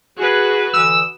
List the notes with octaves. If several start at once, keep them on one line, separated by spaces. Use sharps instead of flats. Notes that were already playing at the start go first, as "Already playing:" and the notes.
F#4 G#4 B4
D3 E3 D#6 E6